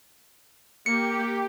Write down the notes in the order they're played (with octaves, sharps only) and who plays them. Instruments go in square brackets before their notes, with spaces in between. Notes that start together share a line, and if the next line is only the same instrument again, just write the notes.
[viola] A#3 [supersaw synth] G4 [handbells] C#7